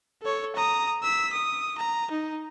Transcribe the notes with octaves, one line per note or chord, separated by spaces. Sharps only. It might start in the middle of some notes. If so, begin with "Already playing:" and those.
A4 C#5
A#5 D#6
E6 B6
D#6
A#5
D#4